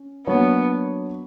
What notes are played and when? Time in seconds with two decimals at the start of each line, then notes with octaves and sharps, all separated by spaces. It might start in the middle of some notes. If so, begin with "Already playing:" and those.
Already playing: C#4
0.27 F#3 A#3 B3 D4 F#4 C#5